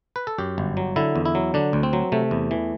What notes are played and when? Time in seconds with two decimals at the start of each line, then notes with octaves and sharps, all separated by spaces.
0.16 B4
0.27 A4
0.38 F#2 G4
0.58 G1
0.77 F#3
0.96 D3 E4
1.16 E2
1.25 E4
1.35 F#3
1.54 D3 D4
1.73 D2
1.83 C4
1.93 F#3
2.12 C3 A3
2.31 E2
2.51 E3